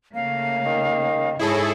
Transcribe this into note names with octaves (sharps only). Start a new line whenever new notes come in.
C#3 A3 A#3 F5
D#3
G#2 E4 G#4 A4 C#5